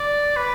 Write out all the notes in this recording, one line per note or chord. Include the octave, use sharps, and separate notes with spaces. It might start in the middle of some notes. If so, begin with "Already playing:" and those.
Already playing: D5
B4